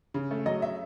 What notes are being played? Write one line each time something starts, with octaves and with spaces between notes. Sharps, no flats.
C#3
A3
F#3 D#5
E5